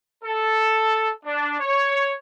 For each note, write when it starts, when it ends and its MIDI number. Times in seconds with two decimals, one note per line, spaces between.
0.23 1.11 69
1.24 1.55 62
1.60 2.14 73